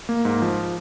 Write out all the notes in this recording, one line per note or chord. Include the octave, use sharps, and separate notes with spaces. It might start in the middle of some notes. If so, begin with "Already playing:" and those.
A#3
G#2
F3